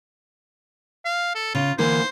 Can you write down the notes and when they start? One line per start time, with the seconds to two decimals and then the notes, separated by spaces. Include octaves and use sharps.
1.05 F5
1.35 A4
1.55 C#3 F4
1.78 D3 E3 A#3 C5